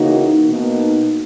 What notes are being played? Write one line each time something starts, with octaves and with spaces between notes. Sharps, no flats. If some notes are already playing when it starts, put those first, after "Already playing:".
Already playing: C#3 E3 A#3 D#4 F#4
B2 A#3 D#4